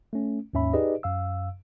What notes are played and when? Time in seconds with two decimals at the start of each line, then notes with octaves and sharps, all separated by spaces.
0.13 A3 C#4
0.53 D#2 G#2 C#4 E5 B5
0.73 D#4 G4 G#4 B4 D5 D#5
1.03 F#2 F5 E6